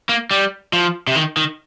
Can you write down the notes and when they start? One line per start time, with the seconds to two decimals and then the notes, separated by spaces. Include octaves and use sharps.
0.09 A#3
0.31 G3
0.73 F3
1.07 C3
1.16 D#3
1.37 D#3